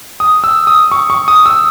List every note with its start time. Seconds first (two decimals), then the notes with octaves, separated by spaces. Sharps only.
0.20 D#6
0.44 E6
0.67 D#6
0.91 C#6
1.10 C#6
1.28 D#6
1.46 E6